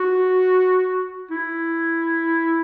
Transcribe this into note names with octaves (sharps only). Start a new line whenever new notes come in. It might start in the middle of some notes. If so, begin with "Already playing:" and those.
Already playing: F#4
E4